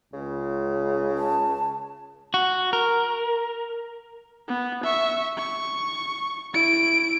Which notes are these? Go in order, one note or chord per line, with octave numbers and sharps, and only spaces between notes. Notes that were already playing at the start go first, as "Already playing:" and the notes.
C#2 C#3
A5
F#4
A#4
B3
E5 C#6
C#6
E4 D7